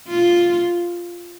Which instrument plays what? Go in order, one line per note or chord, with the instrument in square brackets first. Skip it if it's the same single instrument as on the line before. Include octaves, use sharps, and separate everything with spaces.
[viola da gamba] F4